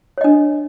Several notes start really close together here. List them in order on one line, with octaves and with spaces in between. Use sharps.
C#5 D#5 D4